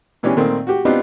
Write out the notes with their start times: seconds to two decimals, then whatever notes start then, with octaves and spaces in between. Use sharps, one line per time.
0.23 B2 E3 C#4 D4 G4
0.37 A#2 D#3 A3 C4
0.67 F#4 G4
0.85 B3 C4 D4 D#4 F4 G4